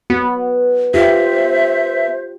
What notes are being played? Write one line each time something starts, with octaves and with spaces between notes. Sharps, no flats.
B3 F#4
F4 G4 C5 E5